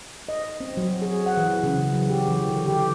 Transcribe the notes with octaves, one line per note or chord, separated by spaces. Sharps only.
D#5
C4
F#3
G#4
F#5
E3
C#3
F#3
G4
E3
D3
G4